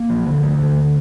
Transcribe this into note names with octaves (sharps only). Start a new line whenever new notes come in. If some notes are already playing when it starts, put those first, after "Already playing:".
Already playing: A#3
F3
D3
A3
D3